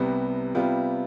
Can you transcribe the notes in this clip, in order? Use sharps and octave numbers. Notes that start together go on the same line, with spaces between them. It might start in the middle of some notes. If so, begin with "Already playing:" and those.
Already playing: C2 C3 G3 B3
C3 G3 B3 F4